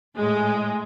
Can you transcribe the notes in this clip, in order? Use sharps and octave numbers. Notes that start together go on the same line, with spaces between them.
A2 G#3